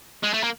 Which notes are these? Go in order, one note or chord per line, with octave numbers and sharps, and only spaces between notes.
G#3
A3
A#3